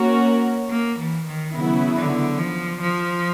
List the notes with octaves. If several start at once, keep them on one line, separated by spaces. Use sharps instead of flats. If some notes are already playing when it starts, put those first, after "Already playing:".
Already playing: A#3 C#4 F#4 A#4
A#3
E3
D#3
C#3 F#3 B3 E4
D3
F3
F3